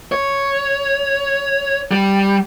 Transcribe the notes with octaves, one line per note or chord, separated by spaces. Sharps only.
C#5
G3